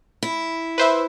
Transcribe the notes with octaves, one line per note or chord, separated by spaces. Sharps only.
E4
B4 C5 E5